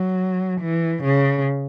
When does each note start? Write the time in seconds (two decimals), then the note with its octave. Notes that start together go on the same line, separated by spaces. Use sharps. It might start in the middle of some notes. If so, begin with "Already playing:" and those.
Already playing: F#3
0.62 E3
1.04 C#3